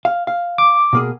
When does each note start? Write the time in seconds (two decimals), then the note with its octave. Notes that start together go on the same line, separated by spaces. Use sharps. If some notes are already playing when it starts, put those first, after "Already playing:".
0.05 F5
0.27 F5
0.58 D6
0.93 B2 A#3 G#4